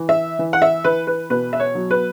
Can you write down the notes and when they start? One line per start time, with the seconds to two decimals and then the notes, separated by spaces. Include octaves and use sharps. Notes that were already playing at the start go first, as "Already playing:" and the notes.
Already playing: E3
0.09 E5
0.39 E3
0.53 F#5
0.62 E5
0.84 E3 B4
1.07 B4
1.30 B2 B4
1.53 E5
1.60 C#5
1.75 F#3
1.91 B4